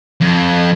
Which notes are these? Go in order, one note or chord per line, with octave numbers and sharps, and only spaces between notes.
F2